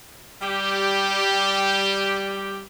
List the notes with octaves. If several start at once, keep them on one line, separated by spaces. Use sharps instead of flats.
G3 G4